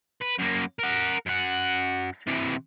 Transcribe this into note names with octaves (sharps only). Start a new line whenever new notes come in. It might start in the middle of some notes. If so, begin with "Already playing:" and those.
B4
F#2 A#3
A#4 F#5
F#2 F#5
C3 E3